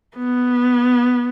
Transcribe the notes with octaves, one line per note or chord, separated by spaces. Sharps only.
B3